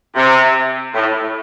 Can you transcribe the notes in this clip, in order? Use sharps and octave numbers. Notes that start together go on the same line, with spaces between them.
C3
A2